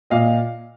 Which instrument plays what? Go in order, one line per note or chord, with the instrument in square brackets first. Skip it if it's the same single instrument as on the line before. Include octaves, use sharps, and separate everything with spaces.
[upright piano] A#2 D#5 F5